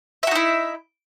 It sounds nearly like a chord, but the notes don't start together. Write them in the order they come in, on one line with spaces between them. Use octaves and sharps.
E5 F#4 D#4 E4